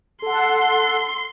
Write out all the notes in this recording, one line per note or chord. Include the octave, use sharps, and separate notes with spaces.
A4 F#5 C6